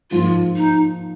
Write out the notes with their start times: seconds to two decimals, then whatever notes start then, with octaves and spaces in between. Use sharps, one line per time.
0.11 G#2 F3 A#3 F4
0.56 D#4